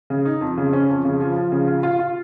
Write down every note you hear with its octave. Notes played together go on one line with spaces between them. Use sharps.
C#3
D#4
F2
C#3
C#4
F2
C#3
F3
F3
C#3
F4
F4
F4